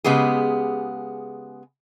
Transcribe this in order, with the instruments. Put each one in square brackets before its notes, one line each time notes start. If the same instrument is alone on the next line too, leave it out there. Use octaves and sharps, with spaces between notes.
[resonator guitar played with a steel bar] C#3 G#3 B3 G4 G#4